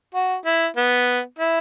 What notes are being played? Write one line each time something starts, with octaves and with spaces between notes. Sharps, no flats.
F#4
E4
B3
E4